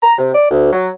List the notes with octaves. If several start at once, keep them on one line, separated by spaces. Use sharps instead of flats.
A#5
C3
D5
D2
F#3